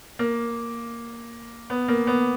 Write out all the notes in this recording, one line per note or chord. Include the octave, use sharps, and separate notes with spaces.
A#3
B3
A#3
B3